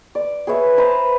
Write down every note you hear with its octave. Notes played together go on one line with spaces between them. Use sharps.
D5
G#4 B4 C#5 E5
B4 C5 A5 A#5